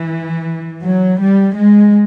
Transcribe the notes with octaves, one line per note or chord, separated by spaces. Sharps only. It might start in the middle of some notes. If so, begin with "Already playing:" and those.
Already playing: E3
F#3
G3
G#3